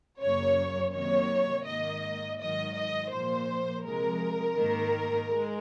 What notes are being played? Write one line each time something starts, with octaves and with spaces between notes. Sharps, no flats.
F#2 C#3 F#3 A#3 C#5
C3 D#3 F#3 A#3 C#5
G#2 D#3 A#3 D#5
G#2 D#3 F#3 D#5
D#5
A#2 F3 A#3 C5
C3 F3 G#3 A#4
G#2 D#3 A#3
G#3